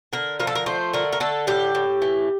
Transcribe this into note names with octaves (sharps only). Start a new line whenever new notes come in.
D3 A#4
F3 A#4
A4
A#4
A3 C5
D3 A#4
A#4
D3 A4
A2 G4
A2
E3